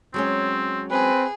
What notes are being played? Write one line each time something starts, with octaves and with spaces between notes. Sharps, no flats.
F#3 G#3 C4 C#4
C4 G#4 B4